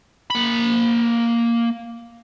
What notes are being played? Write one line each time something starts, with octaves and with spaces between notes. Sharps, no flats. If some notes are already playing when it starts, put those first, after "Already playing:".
A#3 B5